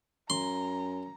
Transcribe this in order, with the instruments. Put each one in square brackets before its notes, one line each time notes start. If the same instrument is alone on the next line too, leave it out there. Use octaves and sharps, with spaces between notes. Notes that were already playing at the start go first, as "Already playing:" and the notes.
[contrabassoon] F#2 [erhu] A#5 [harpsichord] C6